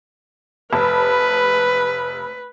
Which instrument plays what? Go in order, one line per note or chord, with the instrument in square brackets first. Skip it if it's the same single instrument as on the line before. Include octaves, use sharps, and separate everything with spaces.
[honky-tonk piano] F1 A5 [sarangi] B4